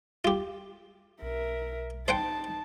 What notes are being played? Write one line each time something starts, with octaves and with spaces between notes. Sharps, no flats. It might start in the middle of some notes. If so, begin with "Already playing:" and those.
F4 G4
B1 A#4 E5
D#4 C5 F#5 G5 A5